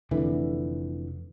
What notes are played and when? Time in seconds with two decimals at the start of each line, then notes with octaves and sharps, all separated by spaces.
0.11 F1 D3 E3